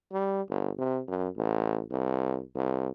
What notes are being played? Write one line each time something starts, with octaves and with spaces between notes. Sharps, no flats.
G3
G1
C3
F#2
A1
C2
C2